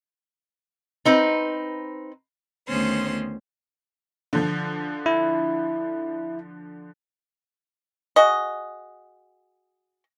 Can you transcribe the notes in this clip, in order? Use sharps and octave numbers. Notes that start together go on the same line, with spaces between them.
C4 D#4 B4
D2 D#3 B3 C#4 C5 C6
D3 F3
E4
F#4 G#4 D#5